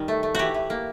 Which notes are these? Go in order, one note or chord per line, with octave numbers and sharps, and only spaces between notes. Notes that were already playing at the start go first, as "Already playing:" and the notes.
Already playing: D#3 G3
A3
A3
E3 F#4 G4
E3
A#3